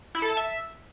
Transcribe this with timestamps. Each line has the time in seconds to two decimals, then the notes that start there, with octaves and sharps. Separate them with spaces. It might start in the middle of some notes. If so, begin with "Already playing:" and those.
0.15 E4
0.22 A4
0.30 A5
0.37 E5